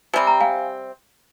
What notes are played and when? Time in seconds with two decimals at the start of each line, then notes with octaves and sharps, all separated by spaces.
0.13 C3 G3 C4 G#5
0.27 A#5
0.41 F5 G#5